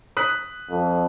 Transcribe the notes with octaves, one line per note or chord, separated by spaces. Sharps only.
D#6 F#6 B6
F2